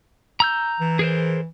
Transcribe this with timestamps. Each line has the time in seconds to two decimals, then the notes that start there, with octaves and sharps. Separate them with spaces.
0.40 A#5 E6 G6
0.80 E3
0.99 G#4 A#4 C5